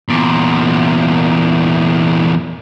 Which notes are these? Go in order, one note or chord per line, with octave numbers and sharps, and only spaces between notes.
E2 A#2